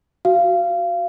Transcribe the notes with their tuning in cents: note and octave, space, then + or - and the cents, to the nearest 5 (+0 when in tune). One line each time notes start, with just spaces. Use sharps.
F#4 +0 F5 -20